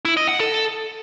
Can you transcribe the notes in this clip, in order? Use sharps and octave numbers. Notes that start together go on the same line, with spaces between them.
E4
D#5
F#5
A4